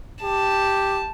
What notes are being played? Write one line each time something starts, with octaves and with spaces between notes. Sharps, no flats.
G4 A5